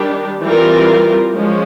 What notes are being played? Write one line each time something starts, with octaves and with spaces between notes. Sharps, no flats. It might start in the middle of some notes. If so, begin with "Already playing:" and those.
Already playing: D#3 G3 D4 G4
E3 G3 C4 F4 A#4
F3 G#3 C#4